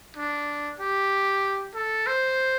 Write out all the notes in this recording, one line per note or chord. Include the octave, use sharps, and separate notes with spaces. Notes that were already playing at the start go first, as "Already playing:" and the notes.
D4
G4
A4
C5